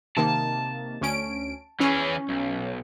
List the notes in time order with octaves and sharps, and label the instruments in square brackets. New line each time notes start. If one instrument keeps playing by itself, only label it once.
[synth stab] C3 D#3 A#3 [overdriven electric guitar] A5
[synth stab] D2 C#4 D7
[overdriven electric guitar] E3 G#4 [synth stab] C#4
[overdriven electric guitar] B1